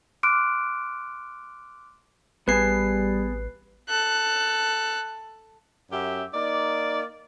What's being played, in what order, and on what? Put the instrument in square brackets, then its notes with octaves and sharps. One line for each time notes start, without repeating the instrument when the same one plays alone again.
[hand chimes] C6 D6 F6 F#6 D7
[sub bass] A1 [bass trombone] G3 [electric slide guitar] B3 G#4 A4 [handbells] B4 C7
[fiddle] A4 F#6
[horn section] F#2 C#4 G4 E5
A#3 D#4 D5